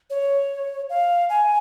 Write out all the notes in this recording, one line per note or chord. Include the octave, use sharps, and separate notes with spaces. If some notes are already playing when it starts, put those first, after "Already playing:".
C#5
F5
G#5